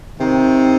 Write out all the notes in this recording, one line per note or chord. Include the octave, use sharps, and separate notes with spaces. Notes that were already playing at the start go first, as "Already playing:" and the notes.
C3 D#3